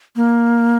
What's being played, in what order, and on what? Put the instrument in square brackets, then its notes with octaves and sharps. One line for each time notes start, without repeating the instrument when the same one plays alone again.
[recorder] A#3